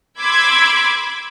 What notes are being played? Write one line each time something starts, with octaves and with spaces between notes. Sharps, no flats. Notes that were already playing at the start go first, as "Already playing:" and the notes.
B5 C6 D6 E6 G#6